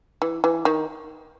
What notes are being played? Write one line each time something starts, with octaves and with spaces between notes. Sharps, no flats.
E3
E3
D#3